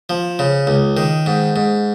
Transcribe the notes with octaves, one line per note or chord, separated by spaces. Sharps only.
F3
C#3
C#2
D#3
G#2
G#2